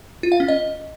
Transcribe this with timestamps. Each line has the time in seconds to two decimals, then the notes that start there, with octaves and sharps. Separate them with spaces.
0.23 F4
0.32 F5
0.40 C#4
0.48 D#5